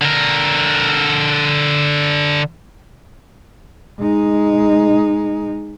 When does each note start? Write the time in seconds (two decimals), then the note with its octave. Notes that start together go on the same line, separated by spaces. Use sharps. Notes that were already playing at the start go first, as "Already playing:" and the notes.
0.01 D3 A#4
4.00 G#3 D#4